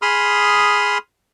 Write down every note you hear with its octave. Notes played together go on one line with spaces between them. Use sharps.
G#4 B5 C6 D#6 F6